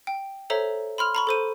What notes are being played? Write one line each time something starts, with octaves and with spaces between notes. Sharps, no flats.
G5
A4 C5 C#5 E5 A#5
B5 C6 F6 F7
A#5 B5 C#6
A4 C5 D#7